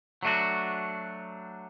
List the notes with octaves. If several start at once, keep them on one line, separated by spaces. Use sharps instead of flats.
F#3 A3 D4 F#4